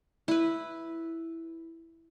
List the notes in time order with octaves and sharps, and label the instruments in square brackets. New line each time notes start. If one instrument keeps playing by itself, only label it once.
[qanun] E4 B4